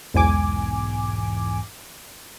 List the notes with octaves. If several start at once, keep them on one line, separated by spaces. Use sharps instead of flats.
B1 E2 G#2 G#5 D6